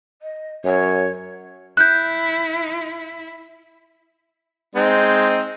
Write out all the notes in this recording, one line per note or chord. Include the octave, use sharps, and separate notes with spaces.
D#5
F#2 C#5
E4 F#6 G6
G#3 C4 D#4